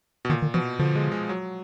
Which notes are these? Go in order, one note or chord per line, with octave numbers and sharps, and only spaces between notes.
B2
A#2 D#3
D#3
B2 F3
D3 F3
G#3
G#3
F#3